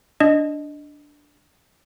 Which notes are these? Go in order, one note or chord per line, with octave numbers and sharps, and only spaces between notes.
D4 D#5